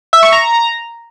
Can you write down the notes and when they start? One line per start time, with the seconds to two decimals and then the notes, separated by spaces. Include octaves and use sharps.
0.13 E5
0.23 C#6
0.33 A#5